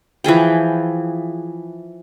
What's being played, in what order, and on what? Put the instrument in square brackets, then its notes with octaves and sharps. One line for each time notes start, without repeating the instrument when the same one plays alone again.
[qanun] E3 F3 G#4 G5